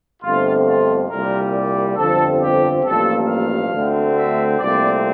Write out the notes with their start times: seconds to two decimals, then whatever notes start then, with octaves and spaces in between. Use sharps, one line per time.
0.23 G1 F2 D3 A3 C4 F4
0.67 F4
1.10 C2 A#2 G3 A#4
1.54 D5
1.97 G1 F2 D3 F3 C4 A4
2.41 G4
2.85 A1 G2 F3 A#3 A4
3.28 F5
3.72 D2 D3 A3 C4
4.16 E5
4.59 C2 A#2 A3 C4 D5